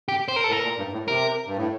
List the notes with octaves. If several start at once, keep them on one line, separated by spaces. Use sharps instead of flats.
G4
C5
A#4
A4
A2
A#4
A#2
G2
A2
C3 A#4
G2
A2